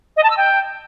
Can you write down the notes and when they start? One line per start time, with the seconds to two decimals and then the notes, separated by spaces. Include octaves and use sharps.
0.16 D#5
0.23 A5
0.30 E6
0.37 G5